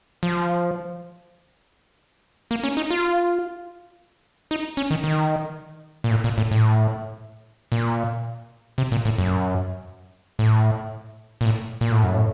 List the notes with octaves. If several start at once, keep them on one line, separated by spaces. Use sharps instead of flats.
F3
A#3
C#4
D#4
F4
D#4
C#4
D#3
D#3
A#2
A2
A#2
A2
A2
A#2
C3
A#2
A2
F#2
A2
A#2
A2
A#2
A2
F#2
A2